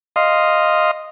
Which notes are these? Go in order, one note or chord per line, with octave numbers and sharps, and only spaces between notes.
D#5 F5 C6